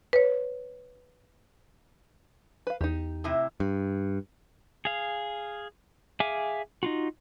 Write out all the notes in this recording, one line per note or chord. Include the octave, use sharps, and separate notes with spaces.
B4 C#5
B4 F5
E2 D#4 G4
A2 C3 E4
G2
G#4 F5
G#4 E5 F5 G#5 D6
D#4 F4 F#4